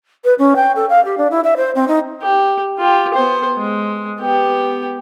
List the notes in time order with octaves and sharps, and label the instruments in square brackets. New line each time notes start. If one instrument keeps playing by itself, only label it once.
[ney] B4
C#4
G5
A4
F5
G4
D4
E4
E5
C5
C4
D#4
[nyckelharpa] G4
F4 G4
B3 C5
G#3
B3 G4